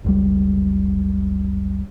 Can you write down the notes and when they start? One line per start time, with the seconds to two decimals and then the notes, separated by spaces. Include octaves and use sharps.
0.04 F#1 C#2 G3